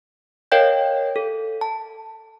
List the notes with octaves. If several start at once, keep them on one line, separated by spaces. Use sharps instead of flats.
A#4 C#5 D#5 F5 G5 G6
A4
A5